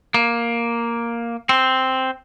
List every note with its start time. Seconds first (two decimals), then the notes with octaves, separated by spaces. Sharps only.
0.14 A#3
1.49 C4